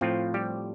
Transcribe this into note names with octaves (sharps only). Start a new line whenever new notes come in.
A2 F3 C4 F4
G3 G4